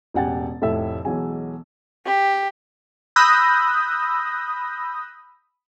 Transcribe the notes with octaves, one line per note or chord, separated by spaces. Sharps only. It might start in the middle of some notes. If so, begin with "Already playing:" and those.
E1 A1 G4 F#5 G#5 A6
F1 A2 E4 A4 E5 E6
B1 E3 F#3 G#3 G#5
G4
B5 D#6 E6 F#6 G6 A#6